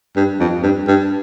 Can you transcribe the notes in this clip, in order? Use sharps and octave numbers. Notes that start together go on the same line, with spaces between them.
G2
F2
G2
G2